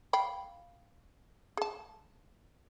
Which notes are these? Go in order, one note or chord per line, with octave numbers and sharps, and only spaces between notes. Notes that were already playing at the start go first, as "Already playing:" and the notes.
F5 G5 B5
G#4 A5